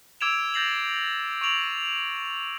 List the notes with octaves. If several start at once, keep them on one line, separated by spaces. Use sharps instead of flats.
D6 E6 G#6 D7 E7 F7
G6 A6 A#6 C7 F7 F#7
C#6 D7 F7 F#7